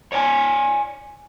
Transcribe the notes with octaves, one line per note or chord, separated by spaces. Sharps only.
C#5 D5 F#5 G#5